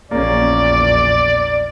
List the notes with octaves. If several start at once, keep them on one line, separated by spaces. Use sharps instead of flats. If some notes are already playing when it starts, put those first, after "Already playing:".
A#1 E2 A#2 A#3 C#4 D5